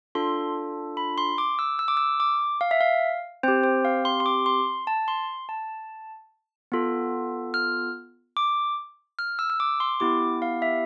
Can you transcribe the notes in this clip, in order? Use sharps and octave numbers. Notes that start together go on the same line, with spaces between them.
D4 F4 A4 C6
B5
C6
D6
E6
E6
D6
E6
D6
F5
E5
F5
C4 G4 C5
C5
F5
C6
C6
D6
C6
A5
C6
A5
B3 F4 A4
F6
D6
F6
E6
E6
D6
C6
B3 E4 G4 D6
F5
E5